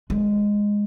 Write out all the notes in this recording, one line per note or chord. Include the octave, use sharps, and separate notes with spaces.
G#3